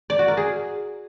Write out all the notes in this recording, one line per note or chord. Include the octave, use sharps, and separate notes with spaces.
D5
F#4
A#4
G#4